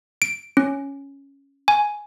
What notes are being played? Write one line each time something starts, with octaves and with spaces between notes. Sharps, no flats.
D7
C#4
G#5